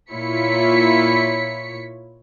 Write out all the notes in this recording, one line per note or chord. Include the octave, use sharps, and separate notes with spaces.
A#2 E4 F4 C#5 B6 C#7